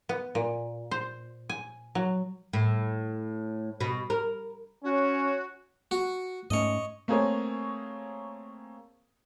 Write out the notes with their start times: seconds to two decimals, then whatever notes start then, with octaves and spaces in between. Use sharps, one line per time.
0.09 B3
0.35 A#2
0.91 C5
1.49 G#5
1.95 F#3
2.53 A2
3.81 B2
4.10 A#4
4.84 C#4 F#4
5.91 F#4
6.51 G#2 A3 C#4 C#5 D#5
7.08 A3 A#3 C4 G#4 A#4 C#5